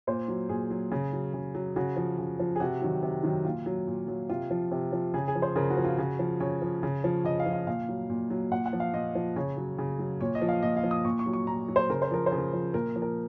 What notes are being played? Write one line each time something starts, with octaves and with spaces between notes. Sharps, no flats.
A#2 C5
F#3
A#2 G#4
F#3
C#3
F#3
C#3
F#3
C#3 F#4
F3
C#3
F3
G#4
C3 F#4
D#3 F#3
C3
D#3 F#3
A#2 F4
F#3
A#2
F#3
C3 F4
F3
C3
F3
C#3 G#4
G#4
F3
C5
C#3 A#4
F#4
F3
F4
C#3 F#4
F3
C#3 C#5
F3
C#3
F3
C#3 D#5
F5
F3
F5
A#2 F5
F#3
A#2
F#3
A#2 F#5
F#5
F3
F5
A#2 D#5
F3
C#3 C#5
F#3
C#3
F#3
A#2 C#5
D#5
F3
F5
A#2 D#5
F5
F3
D#6
A#2 C#6
C#6
F#3
C#6
A#2 A#5
F#3
C5
C#3 A#4
C5
F3 A#4
C5
C#3
A#4
F3
A#2 A#4
F3
A#4